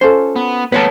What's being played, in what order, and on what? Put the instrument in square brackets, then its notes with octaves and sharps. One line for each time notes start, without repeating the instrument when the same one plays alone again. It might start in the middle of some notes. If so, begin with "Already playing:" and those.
[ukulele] C#4 F4 A4 [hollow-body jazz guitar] C5
[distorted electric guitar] B3
[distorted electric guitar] A3 B3 [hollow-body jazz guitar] B4 C#5 A5